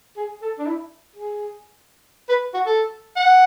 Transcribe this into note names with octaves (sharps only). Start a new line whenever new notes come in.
G#4
A4
D4
E4
G#4
B4
F#4
A4
F#5